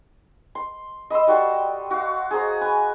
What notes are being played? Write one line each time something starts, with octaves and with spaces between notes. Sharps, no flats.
C6
D#5 B5 C6 E6
G3 F#4 A4 C6
F#4 F5
G#4 C5 A#5 D#6
B4 G#5